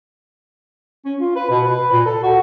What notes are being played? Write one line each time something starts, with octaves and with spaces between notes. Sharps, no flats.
C#4
F4
B4
B2
B4
A#2
A4
F#4